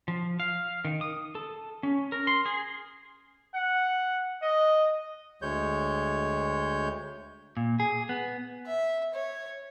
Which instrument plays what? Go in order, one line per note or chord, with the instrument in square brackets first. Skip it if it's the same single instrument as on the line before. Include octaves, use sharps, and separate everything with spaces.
[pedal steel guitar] F3
F5
D#3
D#6
A4
C#4
A#4
C6
G#4
[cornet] F#5
D#5
[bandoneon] D2 G#3 C#5 G6
[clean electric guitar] A#2
G#4
B3
[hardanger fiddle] E5
C#5